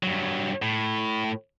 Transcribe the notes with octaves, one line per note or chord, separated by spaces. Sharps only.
G2 F#3
A2